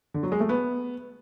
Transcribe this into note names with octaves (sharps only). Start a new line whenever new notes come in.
D3
F#3
G#3
A3
B3